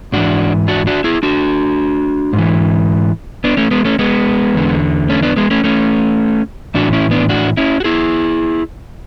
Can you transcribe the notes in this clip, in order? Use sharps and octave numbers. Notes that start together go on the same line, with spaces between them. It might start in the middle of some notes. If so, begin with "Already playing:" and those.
G#2 E3 D4 F#4
D4 F#4
D4 F#4
E4 G#4
D4 F#4
G#2
E3
B3 D4
A3 C#4
G#3 B3
A3 C#4
G#3 B3
E2 D3
A3 C#4
B3 D4
G#3 B3
A3 C#4
A3 C#4
A2 E3 D4 F#4
C#4 E4
B3 D4
D4 F#4
C#4 E4
F#4
E4 G#4